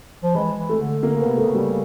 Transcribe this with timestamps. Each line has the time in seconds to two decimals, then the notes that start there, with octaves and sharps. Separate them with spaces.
0.24 F3
0.35 E3 G#3
0.57 E3
0.69 A3
0.80 D3
1.03 D3 A#3
1.16 C#3 B3
1.28 C3
1.37 C#3 A3
1.55 G3